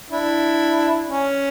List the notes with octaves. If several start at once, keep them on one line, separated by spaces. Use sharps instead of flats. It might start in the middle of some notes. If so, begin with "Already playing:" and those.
D4 E4
C#4